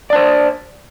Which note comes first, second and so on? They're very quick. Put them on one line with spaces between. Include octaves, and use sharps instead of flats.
D5 D4 C5